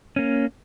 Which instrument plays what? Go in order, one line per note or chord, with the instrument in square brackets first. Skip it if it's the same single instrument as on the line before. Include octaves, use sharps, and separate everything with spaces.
[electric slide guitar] A#3 C#4